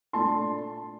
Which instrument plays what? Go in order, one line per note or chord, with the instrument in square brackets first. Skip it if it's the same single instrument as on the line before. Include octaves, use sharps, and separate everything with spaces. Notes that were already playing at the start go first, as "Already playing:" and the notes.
[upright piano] A#2 A3 D4 A5 C6